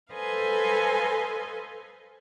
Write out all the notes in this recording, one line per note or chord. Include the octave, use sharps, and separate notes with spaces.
A4 B4 C5 D#5 F5 G#5